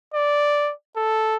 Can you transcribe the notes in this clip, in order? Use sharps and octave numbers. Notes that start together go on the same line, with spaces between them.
D5
A4